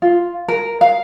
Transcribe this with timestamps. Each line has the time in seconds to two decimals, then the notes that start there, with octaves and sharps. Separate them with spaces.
0.02 F4
0.48 A#4
0.81 F5